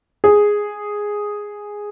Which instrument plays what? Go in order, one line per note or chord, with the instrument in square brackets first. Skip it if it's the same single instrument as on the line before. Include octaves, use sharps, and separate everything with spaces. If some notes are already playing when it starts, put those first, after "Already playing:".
[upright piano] G#4